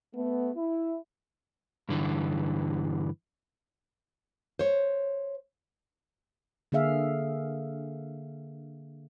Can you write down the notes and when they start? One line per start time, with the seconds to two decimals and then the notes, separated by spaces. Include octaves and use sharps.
0.15 A3 B3
0.56 E4
1.89 G2 D3 E3
4.59 C5 C#5
6.72 D3 A#3 G#4 E5 F5